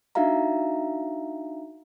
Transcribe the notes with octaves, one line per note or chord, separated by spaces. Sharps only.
D4 D#4 F#4 E5 F5 A#5